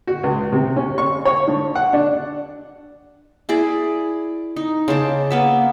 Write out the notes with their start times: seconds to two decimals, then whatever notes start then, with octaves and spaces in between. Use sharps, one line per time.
0.07 F#4
0.23 C#2
0.52 C3
0.77 C#4
0.98 C#6
1.25 C#5
1.48 D3
1.75 F#5
1.93 D4
3.49 E4 G#4 D5
4.56 D#4
4.88 C#3 C5 A5 D6
5.30 A#3 B3 E5